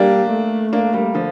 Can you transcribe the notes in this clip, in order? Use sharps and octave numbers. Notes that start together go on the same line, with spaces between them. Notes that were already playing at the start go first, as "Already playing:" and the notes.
Already playing: G3 A#3 D4
A3
A#3 D4
G3 A#3
D3 F3